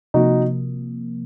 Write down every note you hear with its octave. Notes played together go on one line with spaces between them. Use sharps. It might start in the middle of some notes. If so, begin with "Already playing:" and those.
C3 F3 A#3 D#4 F#4